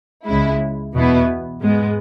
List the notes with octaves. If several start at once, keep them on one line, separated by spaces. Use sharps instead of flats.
C#2 C#3 G#3 E4
E2 B2 B3 E4
G#2 G#3 B3